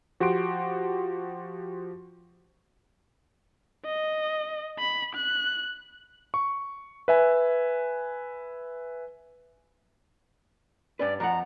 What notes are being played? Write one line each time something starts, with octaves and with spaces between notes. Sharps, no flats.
F3 F#4 G4 F#5 C6 D7
D#5
B5
F#6
C#6
B4 E5 G#5
G2 C#4 B4 D5
F2 F3 F#5 A#5